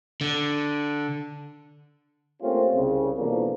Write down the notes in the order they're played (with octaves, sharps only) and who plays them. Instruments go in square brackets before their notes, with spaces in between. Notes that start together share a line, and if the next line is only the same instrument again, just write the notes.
[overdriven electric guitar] D3
[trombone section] A3 A#3 C4 C#4 F4 G4
C2 C#3
B2 D3 E3 F3 A#3